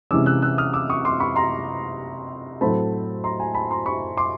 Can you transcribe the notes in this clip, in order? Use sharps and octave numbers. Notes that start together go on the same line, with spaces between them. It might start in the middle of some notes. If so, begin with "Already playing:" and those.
C3 E3 G#3 C#4 D6 E6
E6 F#6
E6 F#6
D#6 F6
D6 E6
C#6 D#6
C6 D6
B5 C#6
A#5 C6
A2 F#3 A3 C4 A5 B5
A#5 C6
G#5 A#5
A5 B5
A#5 C6
B5 C#6
C6 D6